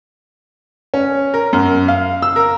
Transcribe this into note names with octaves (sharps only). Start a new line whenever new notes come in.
C#4
A#4
F#2
F5
E6
A#4